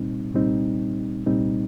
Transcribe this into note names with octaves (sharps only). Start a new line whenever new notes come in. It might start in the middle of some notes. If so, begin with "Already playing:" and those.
Already playing: C2 A#2 G3 C4 D#4
C2 A#2 G3 C4 D#4
C2 A#2 G3 C4 D#4